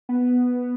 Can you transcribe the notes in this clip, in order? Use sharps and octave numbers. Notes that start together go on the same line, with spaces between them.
B3